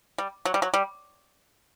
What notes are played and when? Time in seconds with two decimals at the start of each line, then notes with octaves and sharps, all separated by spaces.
0.18 G3
0.45 F#3
0.54 G3
0.62 F#3
0.74 G3